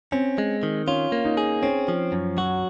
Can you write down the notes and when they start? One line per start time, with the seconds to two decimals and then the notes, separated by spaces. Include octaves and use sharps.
0.12 C4 C#4
0.38 G#3
0.63 D#3
0.87 C#4 F4
1.12 A#3
1.25 D#4
1.37 G#4
1.63 C4 C#4
1.88 F3
2.12 F#2
2.37 F#3 F#4